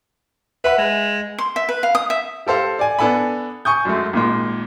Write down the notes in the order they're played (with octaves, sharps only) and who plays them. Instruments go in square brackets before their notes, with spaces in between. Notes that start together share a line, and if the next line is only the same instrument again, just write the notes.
[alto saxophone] B4 [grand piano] E5 F#5 B5
[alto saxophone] G#3
[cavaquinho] C6
E5
B4
F5
D#6
E5
[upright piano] G4 A4 C5 F5
D5 G#5
B3 D4 A4 G#5 B5
G#5 C#6 D#6 G6
F#2 F#3 G#3 A3
G#1 A#2 G#3